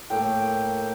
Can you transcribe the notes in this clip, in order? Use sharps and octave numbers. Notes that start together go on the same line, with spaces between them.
A2 A#3 G5